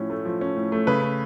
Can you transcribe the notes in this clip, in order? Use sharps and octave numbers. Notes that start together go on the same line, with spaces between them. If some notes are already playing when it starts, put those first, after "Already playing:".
Already playing: A2 F3 C#4
A3
F3
C#4
A2
A3
C#3 B4
A3